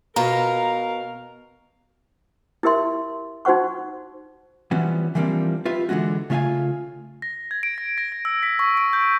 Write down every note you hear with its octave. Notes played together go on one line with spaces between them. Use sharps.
B2 F4 A#4 F5 A#5
E4 G4 A#4 E5 C6
D#4 F#4 C5 F#5 C#6
E3 F3 G3 B3 C#4 F#4
E3 F3 G3 A#3 C4 D4
F4 G4 B4 E5
D3 E3 G#3 C#4 F#4
C#3 A3 F4 E5 F5 G#5
A#6
G#6
D7
A#6
A#6
A#6
E6
B6
C#6
D7
G6